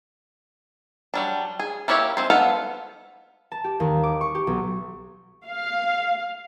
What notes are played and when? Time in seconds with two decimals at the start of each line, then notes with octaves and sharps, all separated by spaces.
1.14 F#3 G3 D4
1.59 G#4
1.88 A#3 E4 G4 C#5 E5
2.17 G#3 C4 C5
2.30 B3 A4 F5 F#5
3.52 A5
3.64 G4
3.80 D#2
4.03 D6
4.21 C#6
4.35 G4
4.47 B1
5.46 F5